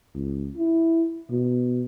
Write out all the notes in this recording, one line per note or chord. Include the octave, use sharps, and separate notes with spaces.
C#2
E4
B2